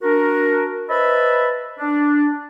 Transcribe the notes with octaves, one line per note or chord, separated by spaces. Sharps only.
D4 F#4 A#4
B4 C5 D#5 E5 A5 B5
D4